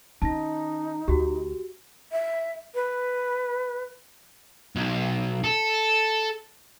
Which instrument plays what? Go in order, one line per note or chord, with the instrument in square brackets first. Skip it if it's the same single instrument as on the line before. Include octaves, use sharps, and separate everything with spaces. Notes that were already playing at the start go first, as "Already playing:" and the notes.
[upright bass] D#3 C#4 [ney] D#4 [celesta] A5 A#6
[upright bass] D2 [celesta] F#4 G4
[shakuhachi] E5
B4
[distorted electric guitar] B1
A4